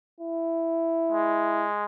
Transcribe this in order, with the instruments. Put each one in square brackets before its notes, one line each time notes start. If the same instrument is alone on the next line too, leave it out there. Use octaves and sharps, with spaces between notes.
[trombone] E4
[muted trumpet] G#3